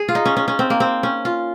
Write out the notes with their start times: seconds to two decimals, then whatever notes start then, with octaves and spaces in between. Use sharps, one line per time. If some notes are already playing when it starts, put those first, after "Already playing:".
Already playing: G#4
0.09 F4
0.15 D#4
0.26 C#4
0.37 C#4
0.48 C#4
0.59 C4
0.70 A#3
0.80 C4
1.03 C#4
1.25 F4